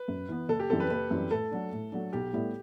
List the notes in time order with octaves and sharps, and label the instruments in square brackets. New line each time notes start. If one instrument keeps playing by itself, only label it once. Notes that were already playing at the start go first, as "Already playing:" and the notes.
Already playing: [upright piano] B4
[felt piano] F#2
E3 B3
[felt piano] F#1 [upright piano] A4
[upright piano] G4
[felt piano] F#2 E3 G3 C4 [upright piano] A4
[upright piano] B4
[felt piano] F#1 [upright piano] B4
[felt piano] F#2 E3 G3 C4
[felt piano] A2 [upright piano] A4
[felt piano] F#3 A3 D4
A2
F#3 A3 D4
[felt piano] B1 [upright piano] G4
[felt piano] A2 G3 B3 E4